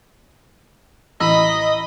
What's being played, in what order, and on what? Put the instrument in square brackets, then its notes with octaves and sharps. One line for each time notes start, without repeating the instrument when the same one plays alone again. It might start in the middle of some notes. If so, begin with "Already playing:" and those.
[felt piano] A1 A#5 E6 [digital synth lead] D#5 [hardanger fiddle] B5